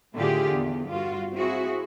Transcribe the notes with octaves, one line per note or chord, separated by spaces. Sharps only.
A2 D3 F4 G4 G#4
E2
G2 F4 F#4
C4 E4 F#4 G#4